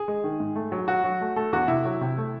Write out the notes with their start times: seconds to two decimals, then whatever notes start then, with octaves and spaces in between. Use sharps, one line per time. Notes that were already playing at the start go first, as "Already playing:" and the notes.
Already playing: G#4
0.08 G#3
0.24 D#3
0.40 G#2
0.56 A3
0.72 F#3
0.88 F#3 F#4
1.04 F#3
1.21 A3
1.36 A3 A4
1.52 E2 F#4
1.68 C3 E4
1.85 F#3
2.01 C3
2.18 A3